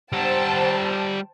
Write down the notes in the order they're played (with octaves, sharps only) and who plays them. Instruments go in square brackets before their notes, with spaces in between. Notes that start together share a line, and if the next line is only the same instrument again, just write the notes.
[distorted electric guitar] G3 F#5 [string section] C5 G5 A5